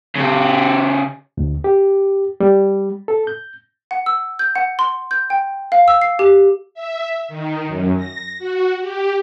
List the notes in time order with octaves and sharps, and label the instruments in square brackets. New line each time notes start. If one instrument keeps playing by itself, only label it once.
[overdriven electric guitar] C#3 G4
[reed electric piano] D2
G4
G3
A4
G6
[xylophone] F#5
E6
G6
F#5
C6
G6
G5
F5
E6
C7
G4
[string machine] E5
D#3
F#2
A#6
F#4
G4